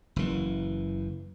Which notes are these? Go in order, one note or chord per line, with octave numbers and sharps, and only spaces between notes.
F#1 E3